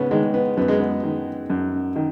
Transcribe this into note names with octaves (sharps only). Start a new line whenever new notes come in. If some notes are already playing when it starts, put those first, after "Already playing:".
Already playing: G#2 C#3 B3 C#4
D#3 G#3
B3
F#2 B3
G#3
B3
D#3
F#2
D#3